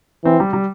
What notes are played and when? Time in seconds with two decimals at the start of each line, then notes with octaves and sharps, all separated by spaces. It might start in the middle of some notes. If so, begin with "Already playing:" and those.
0.24 E3 C4
0.40 G3
0.53 G3